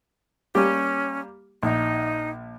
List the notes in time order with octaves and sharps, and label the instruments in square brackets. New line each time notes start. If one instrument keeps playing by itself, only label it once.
[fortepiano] G3 A#3 G4 [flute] C#4
[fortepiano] A#1 [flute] D#4